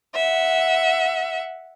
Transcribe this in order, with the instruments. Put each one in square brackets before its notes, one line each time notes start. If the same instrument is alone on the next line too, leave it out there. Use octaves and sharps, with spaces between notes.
[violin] E5 F#5